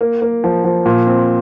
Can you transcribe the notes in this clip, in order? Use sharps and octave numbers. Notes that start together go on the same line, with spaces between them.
A#3
A#3
F3
F3
A#2
C4